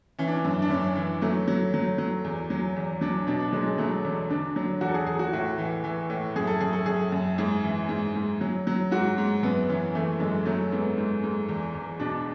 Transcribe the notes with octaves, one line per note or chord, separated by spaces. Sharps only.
E3 C#4
D4
C#4
F#2
D4
F#2 C#4
E3
F#3 A3
F#3
F#3
F#3
E2
F#3
E2
F#3 D4
B2 D4
D4
F#3 G#3
G#3
F#3 A3
E2 C#4
D3 D4
F#3
E2 F#4
A4
G#4
E2 G#4
F#4
A2 F#4
E3
E3
A2
F#2 G#4
A4
F#2 G#4
A4
F#2 G#4
F#2
G#2 G#4
E3
G#2
G#2
F#3
F#3
G#2 F#4
G#2
F#2 B3
E3 C#4
E3 A3
F#2 G#3
F#3 A3
G#2 B3
G#2
G#2
E2
E2
B2 D4